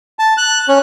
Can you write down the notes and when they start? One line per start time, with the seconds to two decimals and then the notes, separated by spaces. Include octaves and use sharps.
0.19 A5
0.37 F#6
0.68 C#4